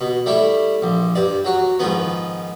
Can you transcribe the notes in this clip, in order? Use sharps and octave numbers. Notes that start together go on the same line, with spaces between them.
B2
G3 A3 E4
A#1
G2 D5
F#3 F#4
G#2 D#3 F3 B3